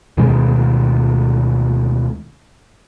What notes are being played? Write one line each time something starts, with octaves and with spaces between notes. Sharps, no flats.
D2 B2 D#3 G#3